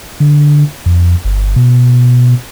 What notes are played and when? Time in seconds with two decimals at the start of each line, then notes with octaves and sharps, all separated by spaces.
0.20 D3
0.86 F2
1.25 G1
1.56 B2